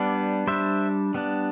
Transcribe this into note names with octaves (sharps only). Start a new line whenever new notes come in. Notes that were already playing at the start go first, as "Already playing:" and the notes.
Already playing: G3 B3 D4
G3 D4 C5 E5
G3 B3 D4